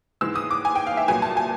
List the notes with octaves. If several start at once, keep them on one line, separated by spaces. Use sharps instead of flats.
G#2 E3 G#3 B3 E6
D#6
D6
G#5
G5
F5
E5
C2 A#2 F#3 B3 G#5
A5
G#5